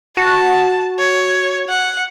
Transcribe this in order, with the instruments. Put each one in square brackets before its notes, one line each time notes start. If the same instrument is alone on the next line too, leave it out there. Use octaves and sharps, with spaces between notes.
[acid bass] F#4 [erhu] A5
[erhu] C#5
F#5